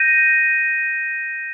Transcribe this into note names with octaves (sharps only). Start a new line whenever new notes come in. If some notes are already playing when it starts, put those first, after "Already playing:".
Already playing: G6 A#6 D#7